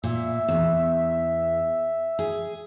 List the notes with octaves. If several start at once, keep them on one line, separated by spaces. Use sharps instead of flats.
A#2 E5
E2
G#4